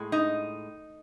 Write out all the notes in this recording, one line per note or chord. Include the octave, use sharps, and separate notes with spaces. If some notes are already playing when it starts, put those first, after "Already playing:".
Already playing: A2 G#3
D#4